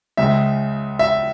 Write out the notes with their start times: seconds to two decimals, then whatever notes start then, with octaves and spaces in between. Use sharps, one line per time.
0.17 C#2 C#3 G#3 E5
0.99 E5